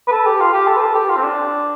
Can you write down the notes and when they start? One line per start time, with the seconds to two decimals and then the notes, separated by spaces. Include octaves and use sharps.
0.08 B4
0.12 A4
0.27 G4
0.40 F4
0.53 G4
0.67 A4
0.77 B4
0.81 A4
0.95 G4
1.09 F4
1.17 C4
1.23 D4